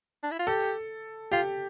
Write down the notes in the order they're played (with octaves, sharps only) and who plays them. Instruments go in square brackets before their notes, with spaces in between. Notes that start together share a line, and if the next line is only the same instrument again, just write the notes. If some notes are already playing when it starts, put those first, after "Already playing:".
[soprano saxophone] D4
E4
F4
[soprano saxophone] G4 [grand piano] A4
[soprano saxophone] F4 [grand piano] G4